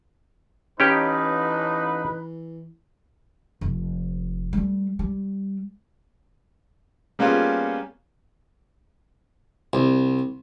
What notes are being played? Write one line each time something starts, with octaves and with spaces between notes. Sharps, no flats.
A1 E3 C#4 D#4 G4 B4 G5
F1
G3 A3
G3
G3 A#3 B3 C#4 F4 G#4
C2